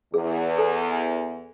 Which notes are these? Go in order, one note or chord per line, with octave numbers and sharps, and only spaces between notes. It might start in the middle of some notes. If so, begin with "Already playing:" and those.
E2 G#4
A4 G#5